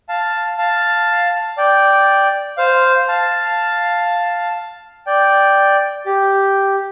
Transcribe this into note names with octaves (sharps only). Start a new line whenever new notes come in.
F5 A5
F5 A5
D5 G5
C5 F5
F5 A5
D5 G5
G4